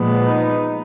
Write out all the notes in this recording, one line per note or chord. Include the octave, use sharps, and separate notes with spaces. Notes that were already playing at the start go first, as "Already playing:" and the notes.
Already playing: A#2 F3 G#3 B3
D#4